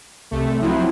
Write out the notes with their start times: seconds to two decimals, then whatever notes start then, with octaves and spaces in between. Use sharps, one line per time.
0.31 C2 C3 A3
0.61 F3 F#3 C4 E4